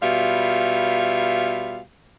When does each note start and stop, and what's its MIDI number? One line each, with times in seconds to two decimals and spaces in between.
0.03 1.79 47
0.03 1.79 55
0.03 1.79 65
0.03 1.79 76
0.03 1.79 77